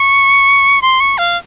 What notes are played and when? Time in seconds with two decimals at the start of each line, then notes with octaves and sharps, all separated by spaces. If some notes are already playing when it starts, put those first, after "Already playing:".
Already playing: C#6
0.82 C6
1.00 C#6
1.18 F5